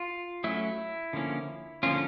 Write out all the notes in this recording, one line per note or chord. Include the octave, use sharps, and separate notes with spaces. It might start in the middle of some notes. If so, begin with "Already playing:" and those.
Already playing: F4
F#3 A3 C#4 E4
D3 F3 A#3 C#4
D3 F3 A#3 C#4 F4